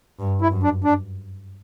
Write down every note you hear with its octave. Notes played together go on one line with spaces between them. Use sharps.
G2
E4
F#2
D4
D4